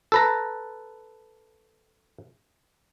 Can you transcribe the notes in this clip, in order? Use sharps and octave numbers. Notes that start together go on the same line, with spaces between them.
A4 B4 A#5